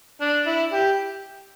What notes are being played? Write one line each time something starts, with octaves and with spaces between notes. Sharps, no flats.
D4
E4
G4